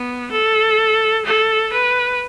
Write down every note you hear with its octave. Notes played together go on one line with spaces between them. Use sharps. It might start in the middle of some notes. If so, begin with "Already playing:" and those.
Already playing: B3
A4
A4
B4